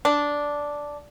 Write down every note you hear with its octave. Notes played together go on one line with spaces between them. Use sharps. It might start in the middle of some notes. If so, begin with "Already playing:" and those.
D4